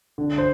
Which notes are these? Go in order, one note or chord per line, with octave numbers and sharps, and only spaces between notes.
D3
C5